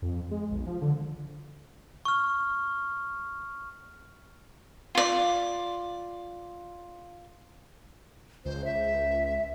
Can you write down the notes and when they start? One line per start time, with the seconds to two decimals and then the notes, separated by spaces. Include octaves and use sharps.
0.02 F2
0.31 G#3
0.51 B1
0.67 F3
0.82 D3
2.05 C#6 F6
4.95 F4 D5
8.45 C#2 C5
8.65 E5